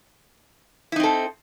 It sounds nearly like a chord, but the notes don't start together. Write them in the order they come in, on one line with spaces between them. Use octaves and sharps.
E4 D#4 C4 A4